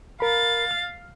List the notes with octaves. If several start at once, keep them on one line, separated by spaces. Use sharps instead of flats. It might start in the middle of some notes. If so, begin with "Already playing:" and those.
A#4 F5 B5 A6
F6